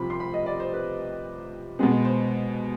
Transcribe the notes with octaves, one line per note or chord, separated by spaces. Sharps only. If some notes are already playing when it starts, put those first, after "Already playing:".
Already playing: C2 C3 F3 B5 C6
C6
B5
D#5
D5
C5
B4
B2 G#3 B3 G#4
C5